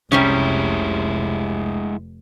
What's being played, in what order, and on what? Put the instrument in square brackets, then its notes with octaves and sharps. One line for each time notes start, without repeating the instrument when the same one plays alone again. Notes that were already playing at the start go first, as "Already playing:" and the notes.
[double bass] F1 [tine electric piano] C2 [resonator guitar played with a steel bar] C3 G3 C#4 [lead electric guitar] G#3 E4